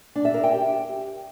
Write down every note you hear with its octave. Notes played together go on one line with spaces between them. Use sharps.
D4
E5
A#4
G5
G4